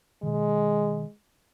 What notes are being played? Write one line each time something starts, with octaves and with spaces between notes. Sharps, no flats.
B2 D#3 G#3